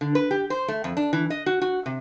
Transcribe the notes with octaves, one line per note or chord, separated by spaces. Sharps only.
D3
B4
G4
C5
A3
F2
D4
E3
D#5
F#4
F#4
C3